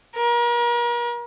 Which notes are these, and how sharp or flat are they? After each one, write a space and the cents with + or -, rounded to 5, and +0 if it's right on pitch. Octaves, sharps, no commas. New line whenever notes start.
A#4 +40